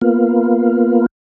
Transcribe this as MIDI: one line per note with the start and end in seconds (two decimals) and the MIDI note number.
0.01 1.06 58
0.01 1.06 59
0.01 1.06 65